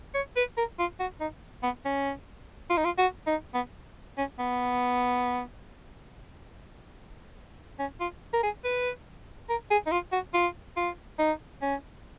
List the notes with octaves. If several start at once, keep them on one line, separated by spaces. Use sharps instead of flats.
C#5
B4
A#4
F4
F#4
D#4
B3
C#4
F4
D#4
F4
F#4
D#4
B3
C#4
B3
C#4
F4
A#4
G#4
B4
A#4
G#4
D#4
F4
F#4
F4
F4
D#4
C#4